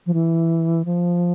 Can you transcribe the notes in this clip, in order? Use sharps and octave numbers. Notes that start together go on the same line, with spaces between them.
F3
E3
F3